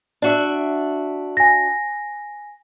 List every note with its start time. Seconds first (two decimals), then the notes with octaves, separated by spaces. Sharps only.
0.22 D4 F#4 E5
1.37 G#5 A#6